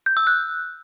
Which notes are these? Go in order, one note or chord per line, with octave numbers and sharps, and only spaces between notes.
G6
E6
F#6